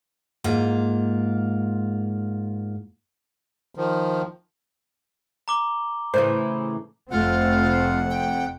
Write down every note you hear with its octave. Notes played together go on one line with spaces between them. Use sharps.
G#2 A#3 F4
D#3 F3
A#5 D6 G7
A2 C#3 E3 C5
F1 F2 A3 C4 F4 F#5
G5